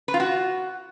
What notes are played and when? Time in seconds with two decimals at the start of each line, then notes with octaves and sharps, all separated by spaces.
0.08 B4
0.14 F4
0.20 F#4